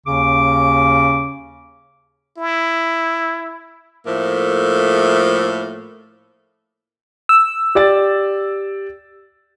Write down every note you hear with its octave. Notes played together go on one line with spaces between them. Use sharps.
D#2 C#3 C#4 D6
E4
A2 F3 A3 A#3
E6
G4 D5 A6